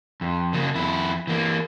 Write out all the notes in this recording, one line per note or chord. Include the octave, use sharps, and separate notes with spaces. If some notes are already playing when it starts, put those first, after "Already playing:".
F2
C#3 A#3
F2 E4
E3 A#3